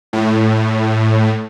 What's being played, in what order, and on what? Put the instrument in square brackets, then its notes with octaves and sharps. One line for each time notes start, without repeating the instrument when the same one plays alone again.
[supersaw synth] A2